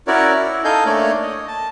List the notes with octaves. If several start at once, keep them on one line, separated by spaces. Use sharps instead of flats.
C#4 E4 F#4 A#4 C#5 D5
E4
D#4 A4 D#5 F5 G#5 G6
A3 A#3 D4 C#5 D5
D#5
A5